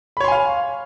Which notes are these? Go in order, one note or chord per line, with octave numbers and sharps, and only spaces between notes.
C#5 F5 G#5 B5 C6